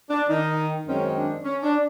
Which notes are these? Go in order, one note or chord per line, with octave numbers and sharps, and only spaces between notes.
D4
D#3 D#4
F#2 D#3 G#3 C4 C#4
D4
C#4
D4